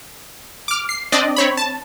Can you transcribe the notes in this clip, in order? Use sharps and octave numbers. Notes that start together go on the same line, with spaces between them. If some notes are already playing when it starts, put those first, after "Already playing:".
D6 F6
C7
C4 D4 D5 D#5
C4 C#5 B5
A5